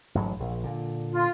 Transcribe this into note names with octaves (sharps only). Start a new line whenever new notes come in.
A1 G#2 F#3
A#1
A#2 D3
F4